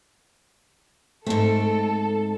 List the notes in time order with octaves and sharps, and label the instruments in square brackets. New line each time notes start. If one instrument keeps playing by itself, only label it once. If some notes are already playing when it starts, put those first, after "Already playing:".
[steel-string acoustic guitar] G#2 C4 [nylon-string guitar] A3 [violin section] A4